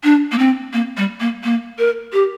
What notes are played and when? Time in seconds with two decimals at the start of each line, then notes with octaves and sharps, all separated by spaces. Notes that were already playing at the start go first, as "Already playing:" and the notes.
0.04 D4
0.32 A#3
0.38 C4
0.73 A#3
0.97 G3
1.20 A#3
1.43 A#3
1.78 A#4
2.13 G4